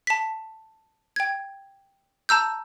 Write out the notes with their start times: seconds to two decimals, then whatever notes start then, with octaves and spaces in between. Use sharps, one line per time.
0.07 A5 B6
1.16 G5 G#6
2.29 A5 A#5 E6 G6